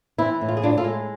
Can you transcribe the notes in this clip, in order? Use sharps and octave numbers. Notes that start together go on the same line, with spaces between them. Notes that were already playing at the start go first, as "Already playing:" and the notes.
E3 C4 E4
A2
F4
G#4
A2 D4 F4
F4 A4
G#3